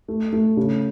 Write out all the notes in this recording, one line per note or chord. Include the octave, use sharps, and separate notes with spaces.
A3
A3
C#3